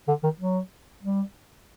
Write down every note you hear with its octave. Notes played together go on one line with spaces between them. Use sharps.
D3
D#3
F#3
G3